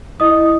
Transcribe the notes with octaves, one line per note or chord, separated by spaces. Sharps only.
E4 D#5 D#6